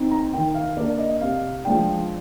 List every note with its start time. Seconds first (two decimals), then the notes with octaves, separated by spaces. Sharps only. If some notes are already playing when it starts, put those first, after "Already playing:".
Already playing: C4 D#4
0.11 A#5
0.33 D#3 G5
0.54 F5
0.77 A#3 D4 D5
0.99 D#5
1.21 C3 F5
1.65 F3 G#3 D4 G5